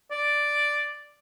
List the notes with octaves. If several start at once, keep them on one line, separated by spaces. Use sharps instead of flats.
D5